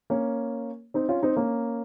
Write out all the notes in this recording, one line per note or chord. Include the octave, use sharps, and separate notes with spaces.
A#3 C#4
C4 D#4
C#4 F4
C4 D#4
A#3 C#4